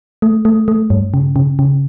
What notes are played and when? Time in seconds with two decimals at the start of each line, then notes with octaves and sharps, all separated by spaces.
0.22 A3
0.45 A3
0.68 A3
0.90 G2
1.14 C#3
1.36 C#3
1.59 C#3